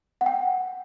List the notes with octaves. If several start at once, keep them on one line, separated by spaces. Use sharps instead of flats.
F#5
G5